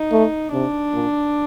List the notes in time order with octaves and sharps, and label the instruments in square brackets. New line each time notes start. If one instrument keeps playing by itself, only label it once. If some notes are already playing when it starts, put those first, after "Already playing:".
Already playing: [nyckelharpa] D#4
[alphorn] A3
[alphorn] C3 [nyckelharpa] D4
[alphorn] A#2